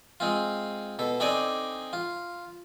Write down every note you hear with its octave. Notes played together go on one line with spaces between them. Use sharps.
G#3 C4 F4
B2 A4
C4 D4 D#4 A4 D5 G#5
F4